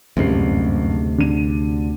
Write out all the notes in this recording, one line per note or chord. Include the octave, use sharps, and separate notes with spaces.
F#1 D2 G2 C3 C7
D3 D#7